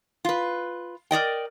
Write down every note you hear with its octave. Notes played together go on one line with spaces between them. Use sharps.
F4 B4
A#4 D5 D#5 G5